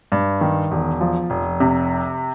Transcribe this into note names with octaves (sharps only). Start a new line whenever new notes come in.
G2
D#3
E1
F3
F1
C3